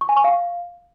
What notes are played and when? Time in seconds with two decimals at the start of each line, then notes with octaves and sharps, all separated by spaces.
0.01 C#6
0.09 G#5
0.17 C#6
0.24 F5